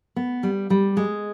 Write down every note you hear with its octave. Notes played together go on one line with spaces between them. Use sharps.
B3
G3
G3
G#3